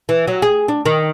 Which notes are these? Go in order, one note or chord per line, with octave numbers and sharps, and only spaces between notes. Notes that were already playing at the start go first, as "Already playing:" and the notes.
E3
F#3
G#4
D4
D#3